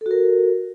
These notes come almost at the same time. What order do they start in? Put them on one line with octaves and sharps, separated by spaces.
A4 F#4 A#4